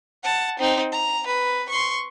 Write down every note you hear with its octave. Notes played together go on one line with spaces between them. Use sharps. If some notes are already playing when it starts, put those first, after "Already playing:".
F#5 A5
C4 D#4
A#5
B4
C6 C#6